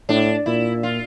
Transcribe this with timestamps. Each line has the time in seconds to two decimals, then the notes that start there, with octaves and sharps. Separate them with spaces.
0.09 A2 D4
0.46 A#2 E4
0.83 F4